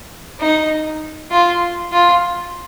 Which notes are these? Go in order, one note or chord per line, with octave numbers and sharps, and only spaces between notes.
D#4
F4
F4